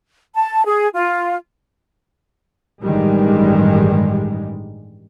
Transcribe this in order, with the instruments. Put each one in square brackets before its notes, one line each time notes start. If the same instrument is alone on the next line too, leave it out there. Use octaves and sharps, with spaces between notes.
[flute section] A5
G#4
F4
[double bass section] A1 G2 D#3 G3 G#3